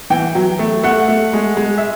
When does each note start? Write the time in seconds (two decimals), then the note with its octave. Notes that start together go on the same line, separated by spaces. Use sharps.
0.10 E3 G5
0.35 F#3
0.59 A3
0.83 A3 F#5
1.08 A3
1.33 G#3
1.57 G#3
1.78 E5